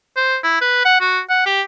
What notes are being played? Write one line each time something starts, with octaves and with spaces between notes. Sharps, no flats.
C5
E4
B4
F#5
F#4
F#5
G4